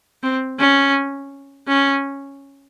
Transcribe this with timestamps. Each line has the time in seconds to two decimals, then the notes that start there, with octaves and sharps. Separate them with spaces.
0.23 C4
0.59 C#4
1.68 C#4